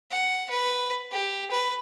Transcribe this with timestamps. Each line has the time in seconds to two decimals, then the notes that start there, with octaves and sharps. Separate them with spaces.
0.11 F#5
0.50 B4
1.11 G4
1.51 B4